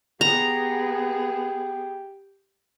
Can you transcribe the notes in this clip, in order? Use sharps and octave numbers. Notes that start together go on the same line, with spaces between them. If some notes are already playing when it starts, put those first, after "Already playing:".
B3 G4 G#4 A#5